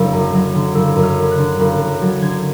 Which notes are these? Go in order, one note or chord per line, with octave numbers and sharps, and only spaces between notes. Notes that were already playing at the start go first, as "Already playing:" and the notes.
Already playing: F#1 D3 F#3 E6
F#2
F#3
D3
F#1 E6
F#2
F6
F#3
F#6
D3
F#1 F#6
F#2
F#3 A6
D3 G#6